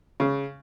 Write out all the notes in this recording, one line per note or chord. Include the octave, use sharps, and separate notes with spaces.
C#3